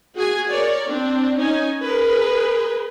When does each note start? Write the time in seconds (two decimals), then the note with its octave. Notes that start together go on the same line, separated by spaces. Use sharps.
0.16 F#4 G#4 G#5
0.51 A#4 C#5 D5
0.88 C4 D4
1.37 C#4 D#4 G#5
1.82 G#4 A#4 B4